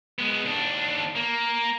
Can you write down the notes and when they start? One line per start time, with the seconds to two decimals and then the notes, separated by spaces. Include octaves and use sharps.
0.19 G#3 B3
0.46 D#2 D4
1.15 A#3